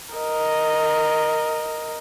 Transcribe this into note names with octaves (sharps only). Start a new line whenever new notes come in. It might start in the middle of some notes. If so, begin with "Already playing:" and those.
A#4 D#5